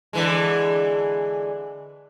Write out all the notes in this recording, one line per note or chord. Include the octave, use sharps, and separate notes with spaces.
D3 E3 G#3